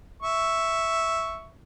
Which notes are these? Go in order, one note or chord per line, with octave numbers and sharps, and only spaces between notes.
E5 C#6